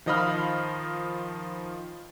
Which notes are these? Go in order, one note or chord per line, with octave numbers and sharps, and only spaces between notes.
D#3 F3 D#5 F5 B5 F6